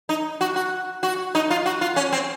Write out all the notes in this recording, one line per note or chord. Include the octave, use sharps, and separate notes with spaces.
D#4
F#4
F#4
F#4
D#4
F4
F#4
F4
C#4
C4